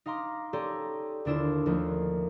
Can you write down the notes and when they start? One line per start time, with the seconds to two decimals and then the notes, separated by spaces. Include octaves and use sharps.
0.06 D#4 F5 A#5 C6 D6
0.53 C#4 G4 A4 D5 A#5 C6
1.25 D#2 D3 D4 E4 F4 E7
1.66 D#2 D#3 F3 A3 A#3